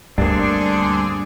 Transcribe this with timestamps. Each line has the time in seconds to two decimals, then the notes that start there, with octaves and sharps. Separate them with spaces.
0.18 D2 G2 D3 A#3 C4 D4 G#4